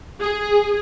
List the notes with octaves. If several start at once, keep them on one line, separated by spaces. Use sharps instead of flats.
G#4